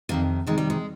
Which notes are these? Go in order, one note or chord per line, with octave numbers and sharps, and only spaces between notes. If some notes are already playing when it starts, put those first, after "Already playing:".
F2 C3 D#3 A#3
F2 C3 D#3 G#3
G3
G#3